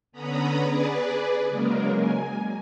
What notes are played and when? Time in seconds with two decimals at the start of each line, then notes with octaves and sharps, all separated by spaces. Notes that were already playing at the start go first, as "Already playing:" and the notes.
0.12 D3 B3 C#4 A#5 B5 D#6
0.60 G#4 B4 D5
1.48 C#3 F#3 G#3 A#3 A#4
1.96 G#5